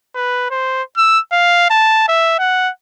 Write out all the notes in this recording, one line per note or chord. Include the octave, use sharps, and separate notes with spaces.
B4
C5
E6
F5
A5
E5
F#5